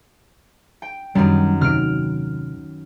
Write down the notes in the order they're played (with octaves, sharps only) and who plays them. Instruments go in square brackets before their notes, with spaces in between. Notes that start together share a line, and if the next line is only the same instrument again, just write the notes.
[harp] G5
[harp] F#2 D#3 [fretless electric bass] G3
[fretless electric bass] D#2 C3 D#3 [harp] F6 D7